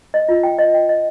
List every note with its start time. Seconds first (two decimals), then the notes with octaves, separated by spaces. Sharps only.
0.14 D#5
0.29 F4
0.43 G5
0.58 D#5
0.75 G5
0.89 D#5